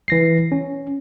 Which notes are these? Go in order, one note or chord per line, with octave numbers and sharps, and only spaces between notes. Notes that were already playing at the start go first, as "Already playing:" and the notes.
E3 A#6 C7
C#4